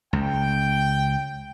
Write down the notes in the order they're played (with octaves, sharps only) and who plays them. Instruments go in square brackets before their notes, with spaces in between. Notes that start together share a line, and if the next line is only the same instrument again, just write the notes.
[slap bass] C#2 [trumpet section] G5